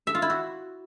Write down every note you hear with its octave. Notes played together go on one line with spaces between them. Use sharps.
E5
F4
E4
F#4